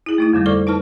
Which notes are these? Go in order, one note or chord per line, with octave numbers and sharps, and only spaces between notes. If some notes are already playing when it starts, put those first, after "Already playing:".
E4 G#4
A3 D#4 E4
F2 D3 G3 A#3
A4 C5 D5 C#6 D6 F6
D#4 B4 A5 F6